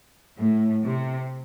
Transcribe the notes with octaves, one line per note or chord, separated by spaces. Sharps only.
A2
C3